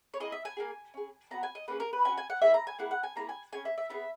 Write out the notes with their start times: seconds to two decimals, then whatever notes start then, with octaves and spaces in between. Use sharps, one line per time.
0.14 C#5
0.20 A#3 E4 G#4 D#5
0.32 E5
0.45 G#5
0.57 A#3 D#4 G#4
0.94 C#4 G#4
1.31 B3 D#4 F#4 A#5
1.43 G#5
1.55 D#5
1.68 A#3 C#4 G#4 B4
1.80 A#4
1.93 B4
2.05 C#4 G#5
2.09 F#4
2.17 G#5
2.30 F#5
2.42 A#3 E4 G#4 E5
2.54 A#5
2.67 G#5
2.79 A#3 E4 G#4 F#5
2.91 F#5
3.03 G#5
3.16 A#3 E4 G#4 A#5
3.29 G#5
3.53 C#4 G#4 G#5
3.65 E5
3.78 E5
3.90 B3 D#4 G#4 E5